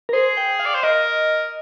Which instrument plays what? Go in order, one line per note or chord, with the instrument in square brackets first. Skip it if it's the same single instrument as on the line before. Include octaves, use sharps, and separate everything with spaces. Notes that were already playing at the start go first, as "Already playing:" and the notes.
[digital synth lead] A#4
[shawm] G#4 [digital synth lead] C5
[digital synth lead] G5
F5
[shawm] D5
C5
[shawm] A#4 [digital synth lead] D#5